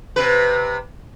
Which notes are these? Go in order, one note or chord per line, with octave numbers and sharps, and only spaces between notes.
C3 B4